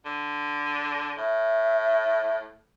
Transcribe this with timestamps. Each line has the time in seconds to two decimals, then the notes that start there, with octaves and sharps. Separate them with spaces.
0.05 D3
1.17 A2 E5